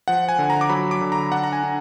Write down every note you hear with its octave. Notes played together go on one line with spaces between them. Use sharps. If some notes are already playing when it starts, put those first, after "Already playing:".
F3 F#5
G#5
D3
A#5
D6
F#3 B5
D6
D3
A#5
D4 F#5
A#5
G#5
D4